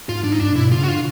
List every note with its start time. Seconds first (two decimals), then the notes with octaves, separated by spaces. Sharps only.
0.08 G#2 F4
0.24 G#2 D4
0.32 D#4
0.40 G2 D4
0.50 A#2
0.55 B2 E4
0.72 C#3 F4
0.83 F#4
0.88 D3 F4